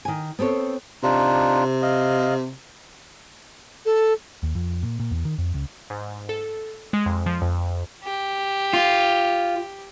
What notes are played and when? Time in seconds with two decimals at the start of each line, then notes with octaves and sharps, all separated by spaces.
0.05 D#3 G#5
0.39 B3 C4 A4 C#5
1.03 C3 D4 D#4 F4
1.82 D#5 F5
3.86 A4
4.43 D#2
4.55 F2
4.83 A#2
5.00 A#2
5.11 E2
5.25 D#3
5.38 F2
5.54 C#2
5.90 G#2
6.29 A4
6.93 G#3
7.06 F2
7.26 F3
7.42 F2
8.04 G4
8.73 F4